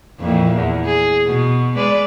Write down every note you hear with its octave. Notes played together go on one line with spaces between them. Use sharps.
F2 A#2 E3
E2
G#4
B2
G#3 B4 D5